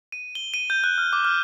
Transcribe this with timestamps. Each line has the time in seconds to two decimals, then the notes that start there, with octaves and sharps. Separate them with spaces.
0.12 D#7
0.35 G7
0.54 D#7
0.70 G6
0.84 F#6
0.98 F6
1.13 D6
1.25 F6